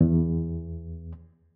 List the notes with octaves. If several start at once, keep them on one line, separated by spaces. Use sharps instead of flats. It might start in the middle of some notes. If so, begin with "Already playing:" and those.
E2